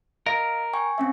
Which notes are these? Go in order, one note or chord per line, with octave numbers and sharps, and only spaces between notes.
A#4 D#5 F5
G5 G#5 C#6
C4 C#4 E5